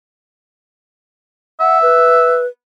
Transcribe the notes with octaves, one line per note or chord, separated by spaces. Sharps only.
E5 F#5
B4